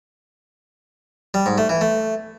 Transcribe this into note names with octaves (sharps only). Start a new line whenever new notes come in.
G3
G#2
A3
E3
A3